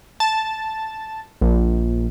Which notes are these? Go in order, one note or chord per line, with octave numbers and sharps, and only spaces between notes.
A5
A#1